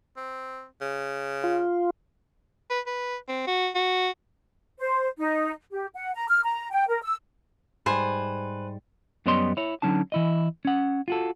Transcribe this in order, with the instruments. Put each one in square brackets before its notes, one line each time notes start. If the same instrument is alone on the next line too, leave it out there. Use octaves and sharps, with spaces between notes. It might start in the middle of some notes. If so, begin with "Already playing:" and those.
[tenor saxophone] C4
C#3
[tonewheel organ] F4
[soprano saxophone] B4
B4
C4
F#4
F#4
[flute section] C5
D#4
G4
F#5
A#5
F6
A#5
G5
A#4
E6
[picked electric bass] G#2 G3 [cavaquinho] B4 C5 G#5
[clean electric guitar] F#2 G3 B3 C#5 D#5 C6
E4 C#5
D3 F#3 C#4 D#4 A5
E3 E4 D#5
C#4 F#5
F4 F#4 A4